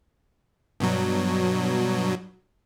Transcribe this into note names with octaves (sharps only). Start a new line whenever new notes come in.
G2 B2 F#3